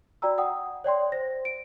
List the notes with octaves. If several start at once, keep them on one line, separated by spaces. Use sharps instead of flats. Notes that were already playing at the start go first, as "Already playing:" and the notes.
F#4 D5 G5 A#5 E6
F#5 G5 D#6
C#5 D5 G5 C6
C5 A#6
D7